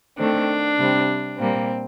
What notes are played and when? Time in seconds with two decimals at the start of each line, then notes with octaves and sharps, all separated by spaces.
0.18 D#3 A3 C4 D4
0.78 C3 G3 C4
1.38 A#2 G3 A#3 C4